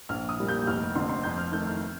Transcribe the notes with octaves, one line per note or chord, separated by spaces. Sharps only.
A#1 F6
D#6
A#2 G3 A#3
G6
F1 F6
F2 D3 C6
C6
F2 G6
F6
D#3 A3 G6
F6